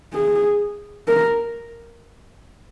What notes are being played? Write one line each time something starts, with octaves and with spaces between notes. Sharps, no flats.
G#4
A#4